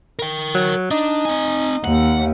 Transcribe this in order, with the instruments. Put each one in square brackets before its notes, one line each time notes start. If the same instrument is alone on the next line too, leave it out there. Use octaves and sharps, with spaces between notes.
[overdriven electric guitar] A#4 G5
[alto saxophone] F#3
[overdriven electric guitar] D4 [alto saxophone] D#4
[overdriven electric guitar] C4 G#5
[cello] D#2 [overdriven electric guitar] F#5